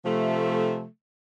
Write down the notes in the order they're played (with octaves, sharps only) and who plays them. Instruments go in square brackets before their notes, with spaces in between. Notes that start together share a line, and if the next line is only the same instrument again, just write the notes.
[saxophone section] C3 F3 A3